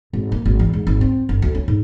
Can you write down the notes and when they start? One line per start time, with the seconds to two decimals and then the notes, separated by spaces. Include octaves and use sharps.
0.13 G#1
0.32 A#3
0.45 G#1
0.59 E2
0.73 G#2
0.87 G#1
1.01 C4
1.29 G1
1.42 D2
1.55 C#4
1.68 G#2